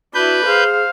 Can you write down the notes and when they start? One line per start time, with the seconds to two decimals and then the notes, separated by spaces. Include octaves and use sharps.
0.14 D4 E4 F#4 B4 G6
0.46 G#4 C5 F5